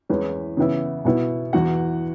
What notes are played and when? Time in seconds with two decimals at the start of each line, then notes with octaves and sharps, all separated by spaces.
0.09 E2 E3 G#3 C#4 B4
0.57 C#3 E3 B3 E4
1.05 B2 B3 E4
1.53 E2 E3 B3 F#4 F#5